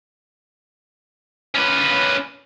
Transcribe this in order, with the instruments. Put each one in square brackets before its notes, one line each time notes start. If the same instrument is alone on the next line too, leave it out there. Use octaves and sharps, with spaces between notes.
[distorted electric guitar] C#4 B4